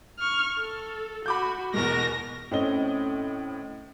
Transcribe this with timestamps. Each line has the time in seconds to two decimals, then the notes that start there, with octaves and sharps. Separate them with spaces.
0.19 C#6 F6
0.59 A4
1.26 F#4 B5 D6 G6
1.74 E2 B2 G#3 A#4 A#6
2.51 A2 C4 C#4 D#5 G7